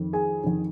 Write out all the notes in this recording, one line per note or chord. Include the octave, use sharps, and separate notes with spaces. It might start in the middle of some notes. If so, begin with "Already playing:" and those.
Already playing: F2 D#3
G#4 G#5
F2 D#3